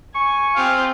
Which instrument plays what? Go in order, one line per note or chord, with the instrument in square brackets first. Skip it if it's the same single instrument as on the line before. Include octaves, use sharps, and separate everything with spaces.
[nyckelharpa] G#5 [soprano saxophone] C#6
[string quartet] C4 F4 G4 [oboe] F5